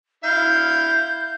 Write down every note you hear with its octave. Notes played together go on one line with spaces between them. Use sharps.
E4 F5 G6